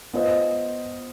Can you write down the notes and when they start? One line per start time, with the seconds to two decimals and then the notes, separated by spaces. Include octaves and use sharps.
0.14 B3 F4 C5 D#5